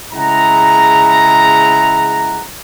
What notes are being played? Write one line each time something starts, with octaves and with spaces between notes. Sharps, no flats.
C#3 G#3 E4 F#5 A#5